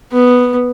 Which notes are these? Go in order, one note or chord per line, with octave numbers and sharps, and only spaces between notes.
B3